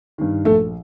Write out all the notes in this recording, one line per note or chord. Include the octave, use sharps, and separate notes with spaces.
G2 D#3
A#1 A3 A4